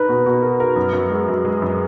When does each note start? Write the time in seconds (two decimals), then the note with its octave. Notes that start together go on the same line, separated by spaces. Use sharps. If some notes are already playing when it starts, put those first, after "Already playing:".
Already playing: D#4 A#4 B4
0.09 B2
0.26 B2
0.42 A#4
0.60 A#4
0.76 F#2
0.93 F#2
1.10 G#3
1.28 F#2
1.45 G#3
1.62 F#2